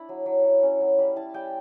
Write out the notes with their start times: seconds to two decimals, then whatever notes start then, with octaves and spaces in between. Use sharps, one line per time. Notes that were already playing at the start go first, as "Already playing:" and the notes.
Already playing: D4 E4 B5
0.09 F#3
0.26 F#3
0.44 F#3
0.63 C#4
0.81 F#3
0.98 G3 B5
1.16 E4 A5
1.34 G3 G5